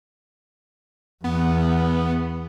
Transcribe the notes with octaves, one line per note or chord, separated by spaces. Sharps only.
E2 B3